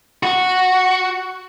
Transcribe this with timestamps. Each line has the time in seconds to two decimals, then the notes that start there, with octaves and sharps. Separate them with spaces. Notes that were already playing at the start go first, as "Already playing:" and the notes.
0.23 F#4